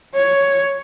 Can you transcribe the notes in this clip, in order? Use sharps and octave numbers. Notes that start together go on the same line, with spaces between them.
C#5